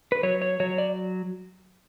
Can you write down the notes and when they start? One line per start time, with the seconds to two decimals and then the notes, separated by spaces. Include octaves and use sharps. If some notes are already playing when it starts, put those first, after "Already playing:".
0.12 B4
0.23 F#3 C#5
0.42 C#5
0.60 F#3 C#5
0.78 D5